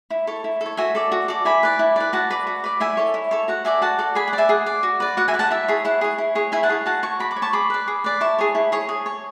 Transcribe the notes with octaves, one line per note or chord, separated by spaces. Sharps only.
E4
A4 C#5
E4
A4 C#5
F#4 E5 G#5
A4 D5
F#4
A4 D5
E4 G#5 B5
B4 D5
E4
B4 D5
F#4 F#5 A5
B4 D5
F#4
B4 D5
E4 E5 G#5
A4 C#5
E4
A4 C#5
F#4 F#5
A4 D5 E5 G#5
F#4 F#5 A5
A4 D5
G#4 G#5 B5
F#5
D5
E5 G#5
G#4 F#5
D5
F#4
B4 D5
F#4 F#5
E5 G#5
B4 D5
F#5 A5
E4 E5
G#4 C#5
E4 F#5
G#4 C#5
E4
G#4 C#5
E4 E5 G#5
F#5 A5
G#4 C#5
F#4 F#5 A5
C#5 A5 C#6
F#4 B5 D6
B5 D6
C#5
A5 C#6
G#4 B5 D6
B4 D5
G#4
B4 D5
E4 A5 C#6
G#4 C#5
E4
G#4 C#5
G#4
C#5